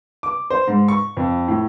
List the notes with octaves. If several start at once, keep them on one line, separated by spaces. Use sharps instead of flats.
D6
C5
G#2
C#6
F2
A2